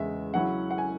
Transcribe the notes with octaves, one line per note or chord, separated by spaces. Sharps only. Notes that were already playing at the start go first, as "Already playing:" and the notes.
Already playing: E2 C#3 G#3 E5
C#3 F#3 C#4 E4 F#5
F#5
G#5